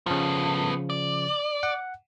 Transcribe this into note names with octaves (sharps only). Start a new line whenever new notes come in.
C#3 F3 B3 A4
D5
F#5